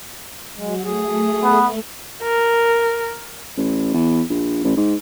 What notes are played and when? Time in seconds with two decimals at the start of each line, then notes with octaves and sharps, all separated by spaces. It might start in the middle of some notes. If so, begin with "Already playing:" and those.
0.56 F#3 G#3 F#4
0.84 A3 G#4
1.43 B3
2.22 A#4
3.57 A1
3.94 E2
4.30 A#1
4.64 A1
4.77 G#2